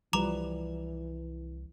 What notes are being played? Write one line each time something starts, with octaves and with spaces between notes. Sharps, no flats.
C2 E3 F3 G3 B4 A#5 D6 F7